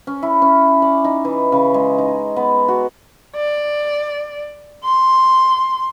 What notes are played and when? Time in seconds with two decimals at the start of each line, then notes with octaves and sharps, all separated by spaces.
0.07 C#4
0.22 E4
0.42 C#4
0.82 D5
1.04 D#4
1.25 E3
1.52 C#3
1.74 G#3
1.98 D#4
2.36 B3
2.68 F#4
3.36 D5
4.84 C6